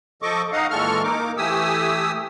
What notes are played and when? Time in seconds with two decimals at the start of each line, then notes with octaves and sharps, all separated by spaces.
0.22 F3 A4 D#5 C#6 D6
0.52 D#4 D#5 F5 F#5
0.70 A#2 E3 G#3 A4 C#6 F6
1.04 A#3 D#4 A#4 D6
1.37 E3 A3 G4 G#5 D#6 E6